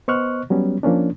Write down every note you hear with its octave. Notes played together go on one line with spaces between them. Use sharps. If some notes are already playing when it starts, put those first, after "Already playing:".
B3 C5 D#5 C#6 F6 F#6
F#3 G3 B3 C#4
F3 A#3 C#4 D4